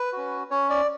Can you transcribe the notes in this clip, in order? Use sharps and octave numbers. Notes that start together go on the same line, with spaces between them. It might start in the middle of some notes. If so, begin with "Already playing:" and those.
Already playing: B4
C#4 F#4
C#4 C#5
D5